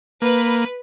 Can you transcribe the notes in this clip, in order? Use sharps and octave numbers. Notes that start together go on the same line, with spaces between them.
A#3 B4